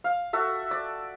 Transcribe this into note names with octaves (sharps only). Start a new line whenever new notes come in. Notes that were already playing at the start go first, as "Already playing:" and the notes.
F5
F#4 A4 E5
D5